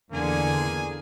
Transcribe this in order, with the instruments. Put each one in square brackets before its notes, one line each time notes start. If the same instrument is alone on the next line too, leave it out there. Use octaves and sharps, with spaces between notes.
[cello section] E2 D3 [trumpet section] A#3 G#4 G#5